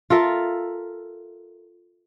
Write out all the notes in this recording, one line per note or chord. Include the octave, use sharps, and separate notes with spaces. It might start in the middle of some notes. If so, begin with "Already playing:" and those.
F4 A4 A#4 E5